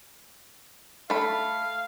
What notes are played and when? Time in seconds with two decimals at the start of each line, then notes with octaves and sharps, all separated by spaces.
1.10 A3 F5 B5